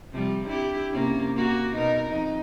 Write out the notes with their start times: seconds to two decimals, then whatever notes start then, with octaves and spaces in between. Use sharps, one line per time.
0.12 C3 F3 G3
0.45 D4 E4 G4
0.91 C3 A#3 C#4
1.35 A#3 F#4
1.74 B2 D#4 A#4
2.09 F2 D#4